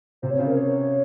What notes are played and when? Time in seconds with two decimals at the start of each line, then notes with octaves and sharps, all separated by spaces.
0.22 C3 C5
0.31 C#5
0.39 C#3 C5
0.48 A#4
0.56 C#5